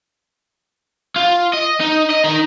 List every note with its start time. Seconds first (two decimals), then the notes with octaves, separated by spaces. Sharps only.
1.16 F4
1.54 D#5
1.81 D#4
2.11 D#5
2.24 D#4 A#4